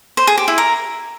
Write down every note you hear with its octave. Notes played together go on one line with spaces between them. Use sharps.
C5
G#4
G4
E4
A#4